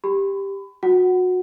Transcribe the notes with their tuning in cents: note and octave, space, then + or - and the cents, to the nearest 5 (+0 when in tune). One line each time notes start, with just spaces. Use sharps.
G4 +5 B5 +30
F#4 -25 F#5 +15